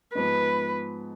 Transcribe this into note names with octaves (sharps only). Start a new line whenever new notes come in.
G#2 F3 B3 B4